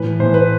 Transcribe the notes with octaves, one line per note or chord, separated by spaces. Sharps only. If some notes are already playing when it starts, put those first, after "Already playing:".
Already playing: A2 E3 B4
A2 E3 C5
B4